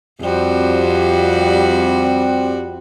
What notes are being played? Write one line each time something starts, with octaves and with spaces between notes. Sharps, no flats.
F2 G3 C4 F#4